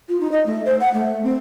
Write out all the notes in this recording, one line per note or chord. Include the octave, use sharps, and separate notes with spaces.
F4
D#4
D#5
A3
C5
F#5
A3
C4